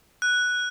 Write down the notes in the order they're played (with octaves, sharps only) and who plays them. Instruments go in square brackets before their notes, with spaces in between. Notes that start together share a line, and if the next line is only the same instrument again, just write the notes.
[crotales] F#6